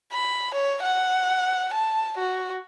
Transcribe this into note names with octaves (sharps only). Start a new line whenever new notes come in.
B5
C#5
F#5
A5
F#4